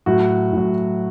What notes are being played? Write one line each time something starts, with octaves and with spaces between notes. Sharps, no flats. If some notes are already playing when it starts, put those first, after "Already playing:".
A2 F#3 F#4
A2 F#3